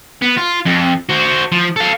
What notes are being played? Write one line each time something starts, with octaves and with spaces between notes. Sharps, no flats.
B3
F4
F2
F#4 C5
F3
A4 F5